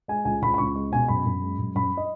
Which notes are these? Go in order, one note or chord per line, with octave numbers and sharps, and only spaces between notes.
G#3 G#5
C#2 G#5
C#2 B5
B5
C#2 C#6
G#3
B2 G#5
F#2 B5
F#2
G#3
F#2
F#2 B5
D#5